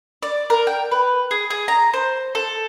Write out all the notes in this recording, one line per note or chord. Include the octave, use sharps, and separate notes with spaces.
D5
A#4
G5
B4
G#4
G#4
A#5
C5
A4